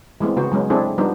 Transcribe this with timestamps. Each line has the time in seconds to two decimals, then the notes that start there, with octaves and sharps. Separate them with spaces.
0.20 E3 G#3 A3 B3 C4
0.36 C#3 B3 F#4 C5
0.52 F#3 G#3 B3 C#4
0.70 G#3 C4 D4 E4 G#4 A4
0.98 F3 G3 B3 D4 D#4 C5